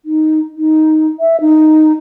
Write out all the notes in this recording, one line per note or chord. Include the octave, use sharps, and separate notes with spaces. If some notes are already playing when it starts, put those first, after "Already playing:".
D#4
D#4
E5
D#4